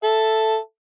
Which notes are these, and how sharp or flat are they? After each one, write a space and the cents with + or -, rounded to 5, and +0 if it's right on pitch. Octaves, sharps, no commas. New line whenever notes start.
A4 +0 E5 +5